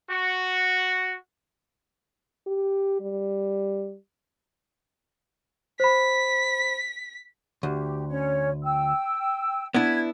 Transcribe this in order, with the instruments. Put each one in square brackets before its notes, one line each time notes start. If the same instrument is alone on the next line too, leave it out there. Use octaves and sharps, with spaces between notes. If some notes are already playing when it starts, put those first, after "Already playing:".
[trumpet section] F#4
[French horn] G4
G3
[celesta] C5 B5 [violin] B6
[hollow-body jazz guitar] D2 [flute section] G4
[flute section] C#4 C#5
G5 E6
[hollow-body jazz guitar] B3 D4 E4 [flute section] G#6